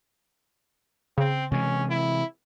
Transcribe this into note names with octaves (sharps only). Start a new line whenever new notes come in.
C#3 C4
C3 E3 G#3 C#4
E4